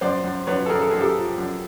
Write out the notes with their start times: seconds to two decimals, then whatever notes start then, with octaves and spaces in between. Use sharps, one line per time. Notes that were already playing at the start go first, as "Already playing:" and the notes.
0.01 F#2 C5 D5
0.24 F#2
0.47 F#2 B4 C#5
0.66 A4
0.69 F#2 G#4 A#4
0.82 A4
0.91 F#2 G#4
1.01 G4 A4
1.15 F3
1.38 F#2